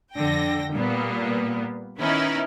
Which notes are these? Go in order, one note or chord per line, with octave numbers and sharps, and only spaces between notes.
F2 D3 G5 A#6
A#2 G3 A#3 B3
D#3 B3 C#4 D#4 E4